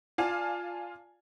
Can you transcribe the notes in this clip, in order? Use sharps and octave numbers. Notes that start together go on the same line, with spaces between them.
F4 D5 F5 G#5 A5